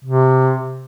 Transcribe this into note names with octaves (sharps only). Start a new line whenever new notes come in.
C3